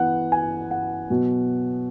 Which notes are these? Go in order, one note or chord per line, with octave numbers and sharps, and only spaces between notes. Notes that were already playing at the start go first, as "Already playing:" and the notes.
Already playing: E3 B3 F#5
G#5
F#5
B2 F#3 B3